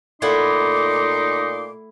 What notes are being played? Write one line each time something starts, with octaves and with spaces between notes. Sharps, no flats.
A#2 A3 D#4 E4 F#5 C6 D6